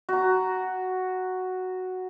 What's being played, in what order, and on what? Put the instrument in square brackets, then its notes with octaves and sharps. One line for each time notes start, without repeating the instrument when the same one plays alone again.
[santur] F#4 A#5